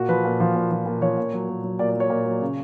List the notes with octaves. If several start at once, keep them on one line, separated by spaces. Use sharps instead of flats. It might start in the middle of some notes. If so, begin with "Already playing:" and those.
Already playing: A#2 F#4
F3 B4
A#2
F3
A#2
F3
A#2
F3 C#5
A#2
F#3
A#2
F#3
A#2 D5
D5
F#3 C#5
A#2
F#3
C#3